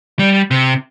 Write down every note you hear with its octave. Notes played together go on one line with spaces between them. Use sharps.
G3
C3